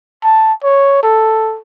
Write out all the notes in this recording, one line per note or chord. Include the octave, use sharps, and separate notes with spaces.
A5
C#5
A4